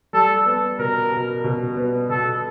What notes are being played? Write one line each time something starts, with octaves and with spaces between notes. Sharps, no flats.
G3 A4
B3
B2 A#4
B2
B2
B3
B2 A4